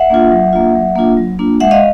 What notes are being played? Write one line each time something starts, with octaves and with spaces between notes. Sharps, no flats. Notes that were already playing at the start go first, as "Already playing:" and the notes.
Already playing: E5 F#5
A#3 D4 F4
F#3
A#3 D4 F4
F#3
A#3 D4 F4
F#3
A#3 D4 F4
G#3 E5 F#5
D#5 F5